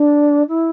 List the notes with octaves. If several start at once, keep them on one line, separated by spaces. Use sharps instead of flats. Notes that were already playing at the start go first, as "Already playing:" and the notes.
Already playing: D4
E4